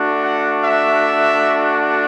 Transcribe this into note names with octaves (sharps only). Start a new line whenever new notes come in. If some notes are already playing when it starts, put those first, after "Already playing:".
Already playing: A3 D4 F#4
F#5
E5